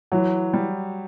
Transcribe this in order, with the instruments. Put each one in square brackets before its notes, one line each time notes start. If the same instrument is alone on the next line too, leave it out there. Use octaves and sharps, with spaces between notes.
[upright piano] E3 [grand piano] F#3
[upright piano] G3